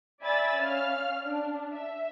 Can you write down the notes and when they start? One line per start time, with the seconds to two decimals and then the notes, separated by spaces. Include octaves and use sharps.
0.22 D5 E5 G#5 B5 E6 A6
0.57 C#4 F5 F6
1.25 D4
1.73 E5